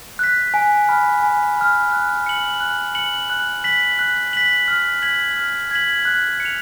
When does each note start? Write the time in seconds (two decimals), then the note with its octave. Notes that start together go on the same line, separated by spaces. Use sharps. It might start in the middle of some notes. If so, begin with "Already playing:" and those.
0.19 F#6 B6
0.54 G#5
0.89 B5 F6
1.22 G#5
1.57 B5 F6
1.92 F#6
2.26 C#7 F#7
2.60 F#6
2.95 C#7 F#7
3.30 F#6
3.64 B6 F#7
3.99 F#6
4.33 B6 F#7
4.68 F6
5.02 G#6 B6 F#7
5.37 F6
5.71 G#6 B6 F#7
6.05 F#6
6.40 C#7
6.45 F7